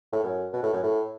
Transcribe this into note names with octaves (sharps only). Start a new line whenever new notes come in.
A2
F#2
B2
A2
F#2
A2